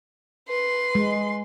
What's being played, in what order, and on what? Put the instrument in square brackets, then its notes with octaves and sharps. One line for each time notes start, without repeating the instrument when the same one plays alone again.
[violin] B4 C6
[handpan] G#3